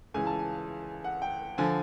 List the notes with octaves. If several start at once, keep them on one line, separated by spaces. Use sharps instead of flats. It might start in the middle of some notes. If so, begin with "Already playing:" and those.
C#2 C#3 E3 G#5
A5
G#5
F#5
G5
D3 F3 G#5